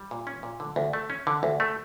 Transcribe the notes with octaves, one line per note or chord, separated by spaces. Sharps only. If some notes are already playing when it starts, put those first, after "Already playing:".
Already playing: G3
A#2
C#4
A#2
D3
D2
A3
C#4
D3
D2
A3